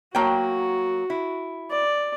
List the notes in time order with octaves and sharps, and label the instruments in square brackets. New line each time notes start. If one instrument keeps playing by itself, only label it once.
[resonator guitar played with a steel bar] F#3 A#3 G5 [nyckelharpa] F#4
[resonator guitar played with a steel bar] E4
[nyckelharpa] D5